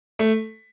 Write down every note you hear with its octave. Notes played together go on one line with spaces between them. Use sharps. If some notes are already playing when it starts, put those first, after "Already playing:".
A3